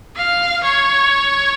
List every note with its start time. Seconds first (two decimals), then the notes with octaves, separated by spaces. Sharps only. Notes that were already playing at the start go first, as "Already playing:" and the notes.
0.16 F5
0.63 C#5